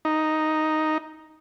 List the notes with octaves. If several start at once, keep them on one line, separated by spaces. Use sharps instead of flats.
D#4